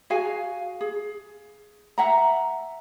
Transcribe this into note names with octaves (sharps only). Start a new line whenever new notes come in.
F#4 G#4 F5 G#5
G#4
E5 F#5 A#5